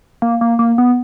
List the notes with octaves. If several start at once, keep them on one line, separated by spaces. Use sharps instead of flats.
A#3
A#3
A#3
B3